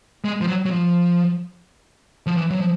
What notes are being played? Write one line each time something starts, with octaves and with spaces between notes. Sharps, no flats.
G#3
F3
F#3
F#3
F3
F3
E3
F#3
F3